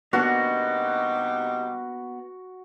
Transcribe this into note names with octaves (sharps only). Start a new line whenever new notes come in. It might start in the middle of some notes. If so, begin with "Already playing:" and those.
C3 G3 A#3 B3 D4 D#4 F#4